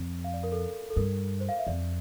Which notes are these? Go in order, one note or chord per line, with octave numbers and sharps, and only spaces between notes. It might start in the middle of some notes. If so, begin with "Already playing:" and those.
Already playing: F2
F5
D5
A#4
A4
A4
G2 A#4
C5
F5
E5
F2 D5